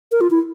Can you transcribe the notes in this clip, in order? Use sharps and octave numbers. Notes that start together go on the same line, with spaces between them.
A#4
F4
E4